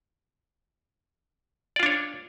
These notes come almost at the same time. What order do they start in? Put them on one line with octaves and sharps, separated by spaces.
D5 F4 D4 C#5